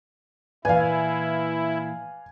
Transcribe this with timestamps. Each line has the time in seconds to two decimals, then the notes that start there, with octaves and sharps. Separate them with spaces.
0.65 A#2 E3 E4 B4 D5 F5 G#5